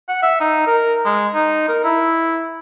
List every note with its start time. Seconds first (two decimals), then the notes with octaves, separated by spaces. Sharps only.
0.08 F#5
0.22 E5
0.40 D#4
0.67 A#4
1.05 G#3
1.34 D#4
1.68 A#4
1.84 E4